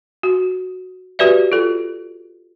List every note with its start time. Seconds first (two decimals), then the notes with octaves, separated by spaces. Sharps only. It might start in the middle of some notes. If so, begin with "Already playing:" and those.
0.23 F#4
1.19 F#4 G4 B4 D5 E5
1.52 F4 A4